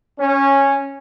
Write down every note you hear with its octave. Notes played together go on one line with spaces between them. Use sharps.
C#4